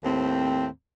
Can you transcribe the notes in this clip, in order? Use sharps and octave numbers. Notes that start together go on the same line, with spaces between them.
D#2 A2 C4